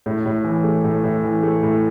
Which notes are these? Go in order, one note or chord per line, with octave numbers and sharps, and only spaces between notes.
A2
A2
E3
A3
A2
A2
E3
A3
A2